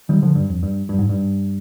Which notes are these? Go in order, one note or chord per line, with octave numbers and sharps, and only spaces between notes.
D#3 G3
D3 F3
G2
F2
G2
G2
G#2
G2